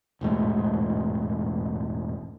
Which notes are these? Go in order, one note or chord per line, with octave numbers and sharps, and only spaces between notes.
E1 A1 G#2 A3